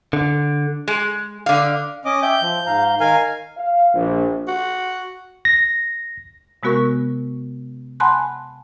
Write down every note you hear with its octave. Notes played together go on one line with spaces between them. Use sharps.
D3
G#3
D3 F5
C#4 D#5 D6
E5 G5 G6
F3
G#2 F5 A#5
D#3 A#4 F5 G#5
F5
A#1
F#4
A#6
C3 G#3 B3 F#4 A#4 C#6
F#5 G#5 A5 B5 C6 F#6